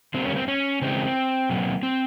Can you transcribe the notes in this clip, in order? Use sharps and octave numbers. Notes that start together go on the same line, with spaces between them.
D3 G3 A#3 C4
C#4
C4
C#4
C#3 E3 G#3 C4
B2 F#3 A#3
C4